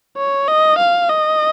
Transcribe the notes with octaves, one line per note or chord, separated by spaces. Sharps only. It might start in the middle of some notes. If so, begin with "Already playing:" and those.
C#5
D#5
F5
D#5